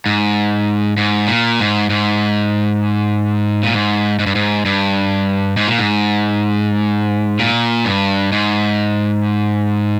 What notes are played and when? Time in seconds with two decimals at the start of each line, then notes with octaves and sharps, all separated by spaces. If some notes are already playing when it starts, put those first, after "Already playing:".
0.06 G#2
0.97 G#2
1.28 A#2
1.60 G#2
1.90 G#2
3.63 A#2
3.74 G#2
4.19 G#2
4.26 G2
4.35 G#2
4.65 G2
5.57 G#2
5.68 A#2
5.79 G#2
7.39 A#2
7.85 G2
8.32 G#2